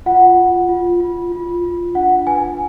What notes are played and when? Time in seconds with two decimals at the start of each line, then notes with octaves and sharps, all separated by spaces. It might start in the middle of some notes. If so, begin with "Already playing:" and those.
0.06 F4 F#5
0.38 F4
0.69 F4
1.01 F4
1.32 F4
1.64 F4
1.95 D4 F#5
2.27 B4 G#5